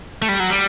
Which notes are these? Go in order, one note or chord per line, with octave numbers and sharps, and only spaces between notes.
A3
G3
F#3
G3